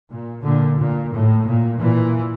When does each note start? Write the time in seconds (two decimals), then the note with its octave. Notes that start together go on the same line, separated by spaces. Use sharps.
0.09 A#2
0.43 A#2 D3
0.78 A#2
1.12 A2
1.45 A#2
1.79 A#2 E3